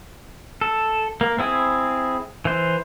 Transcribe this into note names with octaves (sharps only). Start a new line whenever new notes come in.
A4
A#3
C4 E4 G#4
E3 C5